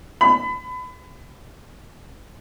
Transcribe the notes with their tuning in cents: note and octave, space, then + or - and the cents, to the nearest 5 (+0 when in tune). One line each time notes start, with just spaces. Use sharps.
B5 +30